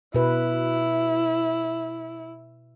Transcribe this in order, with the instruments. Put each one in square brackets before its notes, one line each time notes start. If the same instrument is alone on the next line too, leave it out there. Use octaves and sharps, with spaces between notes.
[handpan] B2 B4 [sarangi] E4